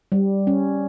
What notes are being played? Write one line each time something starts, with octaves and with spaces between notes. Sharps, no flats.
G3
C#4